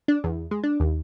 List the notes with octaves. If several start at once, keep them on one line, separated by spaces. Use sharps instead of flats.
D4
E2
G#3
D4
D#2